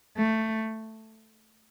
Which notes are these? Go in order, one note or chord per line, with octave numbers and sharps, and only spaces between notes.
A3